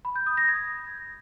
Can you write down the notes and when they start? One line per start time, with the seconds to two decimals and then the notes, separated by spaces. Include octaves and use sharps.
0.05 B5
0.16 G6
0.26 D#6
0.37 A#6
0.48 G#6